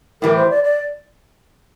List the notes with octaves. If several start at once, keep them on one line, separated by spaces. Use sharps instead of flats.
A2 E3 G3 A#4
C5
D5
D5